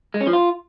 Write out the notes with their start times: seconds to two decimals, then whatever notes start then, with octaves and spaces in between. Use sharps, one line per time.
0.14 G#3
0.21 C#4
0.27 F3
0.33 F4